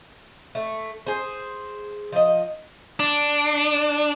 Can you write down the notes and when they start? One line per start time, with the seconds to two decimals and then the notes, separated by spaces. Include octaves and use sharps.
0.55 A3
1.07 G#4 C5
2.12 F3 D#5
3.00 D4